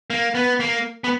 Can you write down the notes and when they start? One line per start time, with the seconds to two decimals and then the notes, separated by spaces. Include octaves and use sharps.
0.10 A#3
0.35 B3
0.60 A#3
1.04 B3